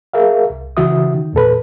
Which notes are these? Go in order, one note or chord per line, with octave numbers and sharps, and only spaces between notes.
G#4 A#4 E5 F5
C2
C#3 E3 F#4 E5 D#6
D#3
E2 A#2 A4 B4